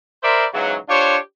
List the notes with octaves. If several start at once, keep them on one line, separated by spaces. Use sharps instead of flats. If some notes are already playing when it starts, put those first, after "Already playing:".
A#4 C5 D5 E5 B5 C6
G#2 C#3 E3 F#3
D4 F4 G4 C5 C#5